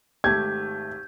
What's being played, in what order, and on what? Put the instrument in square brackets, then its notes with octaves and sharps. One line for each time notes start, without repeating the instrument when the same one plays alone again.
[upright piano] G#1 A3 [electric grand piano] G4 [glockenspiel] G6 [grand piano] G#6